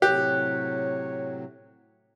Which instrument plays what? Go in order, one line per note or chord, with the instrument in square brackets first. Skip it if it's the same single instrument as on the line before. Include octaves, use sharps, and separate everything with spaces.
[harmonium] A2 C3 F#3 [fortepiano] G4 [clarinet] C#5 [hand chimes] F#6